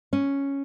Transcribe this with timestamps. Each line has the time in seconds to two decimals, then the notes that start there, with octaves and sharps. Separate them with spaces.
0.13 C#4